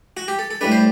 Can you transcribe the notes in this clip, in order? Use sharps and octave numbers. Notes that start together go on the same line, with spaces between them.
F#4
G4
A4
A4
A2 G3 D4 B4
C5